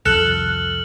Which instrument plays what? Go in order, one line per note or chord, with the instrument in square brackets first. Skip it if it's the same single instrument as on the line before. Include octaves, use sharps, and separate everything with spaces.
[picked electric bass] C2 F2 [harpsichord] A4 [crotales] F6 F#7 [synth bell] F#6